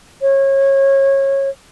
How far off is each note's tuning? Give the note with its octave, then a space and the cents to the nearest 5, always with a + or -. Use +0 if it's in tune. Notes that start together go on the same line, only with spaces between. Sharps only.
C#5 -25